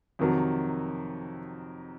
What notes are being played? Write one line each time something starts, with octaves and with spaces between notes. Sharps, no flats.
F2 C3 D#3 F#3